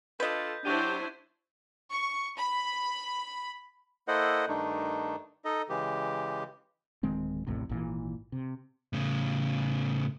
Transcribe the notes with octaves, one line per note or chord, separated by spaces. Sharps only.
D4 F4 A4 B4 D#5 G6 G#6 B6
F#3 D4 E4 G4 C5 C#6 D#7
C#6
B5
A#3 E4 A4 C5 D#5 F#5
G2 D#3 A3 D4 D#4
D#4 A4 D#5
C#3 E3 G#3 G4
D1 D#3 G#3 C4
A1 E2 A2 C3
G#1 A#2 E3
C3
A2 C#3